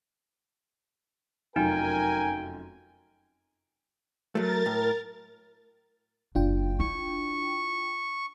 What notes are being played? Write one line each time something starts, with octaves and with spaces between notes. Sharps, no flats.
F1 F#2 D#4 F4 A#4 G5 G#5
F#3 A3 A#4 A6
A2
F#1 D4 F4 G5
E4 C#6